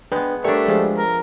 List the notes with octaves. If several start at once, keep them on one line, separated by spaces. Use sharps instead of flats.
G#3 B3 D4 B4 G5
G3 A3 D4 A#4 C#5
F3 G#3 G#4
A#4